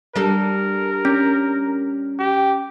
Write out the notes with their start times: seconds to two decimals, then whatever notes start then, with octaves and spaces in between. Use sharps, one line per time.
0.16 G3 D4 A4 A#4
1.05 C#4
2.19 G4